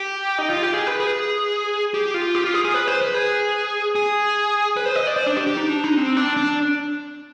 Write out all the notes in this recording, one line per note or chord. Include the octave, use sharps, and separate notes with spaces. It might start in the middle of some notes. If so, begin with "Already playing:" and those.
Already playing: G4
D#4
F4
G4
G#4
B4
G#4
G4
F4
G4
F4
G#4
G#4
B4
C5
B4
G#4
G#4
B4
C5
D#5
D5
C5
D4
G4
G4
D#4
D4
D#4
C4
D4
D4